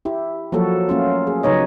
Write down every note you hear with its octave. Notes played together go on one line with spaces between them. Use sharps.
E4 G4
F3 F#3 A#3 F#4 A4
A3 A#3 C#4 F4
G#4
C#3 F#3 D#4 B4 C#5 D#5